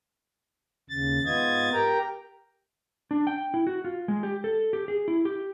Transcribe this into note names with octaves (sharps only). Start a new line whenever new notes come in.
D#2 C#3 A6
G#2 B3 F4 D#5 G#6 A6
G4 A#4 G5 A#5
D4
G5
E4
F#4
F4
G#3
G4
A4
G4
G#4
E4
G4